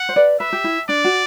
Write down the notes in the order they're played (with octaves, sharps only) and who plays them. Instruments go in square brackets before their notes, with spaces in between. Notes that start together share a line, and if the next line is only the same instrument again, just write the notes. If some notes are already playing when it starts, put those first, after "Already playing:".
Already playing: [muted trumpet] F#5
[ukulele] C5
B4 D5
[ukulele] B4 [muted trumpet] E5
[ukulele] G4
E4
[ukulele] D4 [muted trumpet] D5
[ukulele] F#4